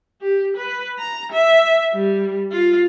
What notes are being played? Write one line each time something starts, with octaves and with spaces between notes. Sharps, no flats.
G4
B4
A#5
E5
G3
F4